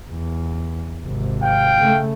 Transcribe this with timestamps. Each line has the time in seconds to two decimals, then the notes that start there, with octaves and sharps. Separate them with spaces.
0.10 E2
1.05 G#1 C3
1.42 F5 G5
1.79 C#3 A3